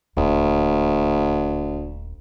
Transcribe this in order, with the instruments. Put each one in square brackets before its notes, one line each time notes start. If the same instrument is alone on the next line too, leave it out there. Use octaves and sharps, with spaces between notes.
[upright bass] D#1 [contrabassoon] D2